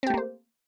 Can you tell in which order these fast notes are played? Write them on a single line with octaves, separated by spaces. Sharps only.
C4 G4 A3 A#3 C5